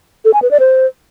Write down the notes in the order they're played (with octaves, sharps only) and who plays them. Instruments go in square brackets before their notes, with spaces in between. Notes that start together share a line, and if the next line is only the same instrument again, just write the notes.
[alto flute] A4
G#5
B4
D5
C5